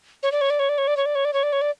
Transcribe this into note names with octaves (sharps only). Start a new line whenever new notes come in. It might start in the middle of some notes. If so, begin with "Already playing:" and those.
C#5
D5
C#5
D5
C#5
D5
C#5
D5
C#5
D5
C#5
D5
C#5
D5
C#5
D5